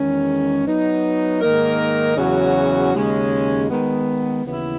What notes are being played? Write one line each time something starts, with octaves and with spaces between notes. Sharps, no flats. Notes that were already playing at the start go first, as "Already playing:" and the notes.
Already playing: E2 D#3 G#3 C#4
F#3 B3 D#4
G#2 D#3 A#3 D#4 A#4
E2 C#3 F#3 C#4 F#4
D#2 C#3 G#3 C#4
D#3 G#3 B3
D#2 C#3 E3 B3 E4